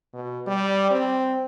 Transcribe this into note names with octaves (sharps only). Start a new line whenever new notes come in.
B2
G3
C4